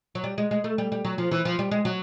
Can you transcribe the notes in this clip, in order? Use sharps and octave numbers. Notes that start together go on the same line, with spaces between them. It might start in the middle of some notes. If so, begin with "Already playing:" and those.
F#3
G3
G#3
G#3
A3
G3
G3
F#3
F3
E3
F3
G3
G#3
F#3